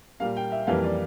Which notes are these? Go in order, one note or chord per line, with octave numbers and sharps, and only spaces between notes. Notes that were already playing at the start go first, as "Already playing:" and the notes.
A#2 G3 A#3 F5
G5
E5
F2 E3 G3 A#3 F5
D5